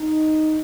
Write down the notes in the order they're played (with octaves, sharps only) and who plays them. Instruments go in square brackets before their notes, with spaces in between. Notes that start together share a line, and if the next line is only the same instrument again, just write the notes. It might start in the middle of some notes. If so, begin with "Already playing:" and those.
Already playing: [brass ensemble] D#4